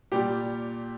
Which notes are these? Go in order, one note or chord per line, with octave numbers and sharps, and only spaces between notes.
A#2 G3 G4